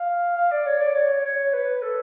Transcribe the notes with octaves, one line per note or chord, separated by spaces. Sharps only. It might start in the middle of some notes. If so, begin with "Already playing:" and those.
Already playing: F5
F5
D5
C#5
D5
C#5
C#5
B4
A4